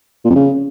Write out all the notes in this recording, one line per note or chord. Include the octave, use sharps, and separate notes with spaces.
A#2
F2
C#3